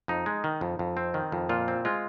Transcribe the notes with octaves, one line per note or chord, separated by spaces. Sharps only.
F2 D#4
G#3
D#3
F2
F2
C4
D#3
F2
A#2 F4
C4
G#3 F4